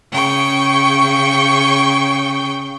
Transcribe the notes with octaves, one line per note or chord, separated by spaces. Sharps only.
C#3 G5 C#6